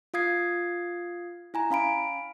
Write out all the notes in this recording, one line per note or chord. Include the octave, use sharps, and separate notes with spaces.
F4 F5 D#6 G#6 C7
E4 G#5 A#5
C#4 F5 B5 D7